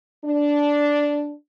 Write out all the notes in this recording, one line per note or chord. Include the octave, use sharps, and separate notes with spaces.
D4